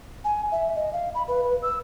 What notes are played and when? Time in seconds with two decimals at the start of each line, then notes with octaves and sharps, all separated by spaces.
0.24 G#5
0.52 E5
0.76 D#5
0.93 F5
1.15 B5
1.28 B4
1.44 B4
1.62 E6